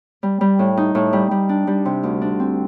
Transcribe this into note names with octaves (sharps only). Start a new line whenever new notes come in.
G3
G3
A2
D#4
A2
G3
G3
D4
G3
C3
D2
D4
C4